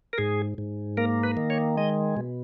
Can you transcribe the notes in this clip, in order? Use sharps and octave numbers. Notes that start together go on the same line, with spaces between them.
A#4
G#2 G#4
G#2
A#3 A#4
B4
D#3
C#5
G#3 D#5
B2